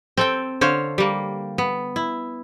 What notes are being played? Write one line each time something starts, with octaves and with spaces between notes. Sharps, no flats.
C4 A4 G5
D3 C5 C#5 F5
G3 A#3
B3
E4